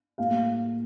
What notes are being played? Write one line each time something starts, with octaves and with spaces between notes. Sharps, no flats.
A2 G3 A#3 F5